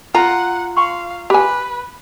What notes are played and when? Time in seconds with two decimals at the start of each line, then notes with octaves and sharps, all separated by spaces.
0.14 F4 F#5 A#5
0.77 F5 G5 C6 C#6
1.30 G4 B4 G#5